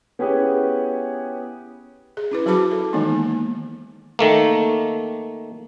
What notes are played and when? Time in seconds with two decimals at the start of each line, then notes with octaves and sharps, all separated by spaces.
0.19 B3 C#4 E4 G4 G#4 B4
2.17 G#4
2.31 C#4 E4 B4
2.46 F#3 F#4 C5 A5 B5 D6
2.71 A4
2.93 D#3 E3 G#3 A#3 B3 D#4
4.19 D#3 A3 A#3